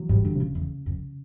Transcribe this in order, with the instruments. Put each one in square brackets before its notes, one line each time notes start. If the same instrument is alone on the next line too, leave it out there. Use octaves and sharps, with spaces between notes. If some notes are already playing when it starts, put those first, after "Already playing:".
Already playing: [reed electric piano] E3 F#3
[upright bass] G#2 [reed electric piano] G3
[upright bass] F#2 [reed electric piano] D3
[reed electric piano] C3
[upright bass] F2 [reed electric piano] C#3
[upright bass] E2
F2